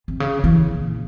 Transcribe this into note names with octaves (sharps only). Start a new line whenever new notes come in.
C3
C#3
E3
A#2